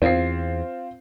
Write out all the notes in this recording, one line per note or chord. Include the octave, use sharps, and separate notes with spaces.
E2 C4 F4 C7